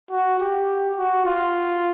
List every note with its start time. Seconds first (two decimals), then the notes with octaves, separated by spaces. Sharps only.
0.11 F#4
0.40 G4
0.97 F#4
1.25 F4